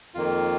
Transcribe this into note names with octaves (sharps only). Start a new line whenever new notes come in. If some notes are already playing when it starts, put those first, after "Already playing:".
F2 D#3 A#3 F4